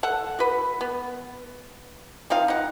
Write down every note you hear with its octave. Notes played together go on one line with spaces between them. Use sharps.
A4 F#5
F#4 B4
B3
F3 C4 D#4 F5
D#4 F#5